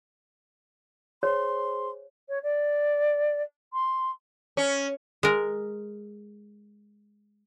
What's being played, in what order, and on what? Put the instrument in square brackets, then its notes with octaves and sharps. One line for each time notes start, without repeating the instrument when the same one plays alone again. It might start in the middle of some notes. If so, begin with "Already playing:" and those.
[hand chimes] G#4 C5 [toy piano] C#5 [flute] C6
[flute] C#5
D5
C6
[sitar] C#4
[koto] G#3 A#4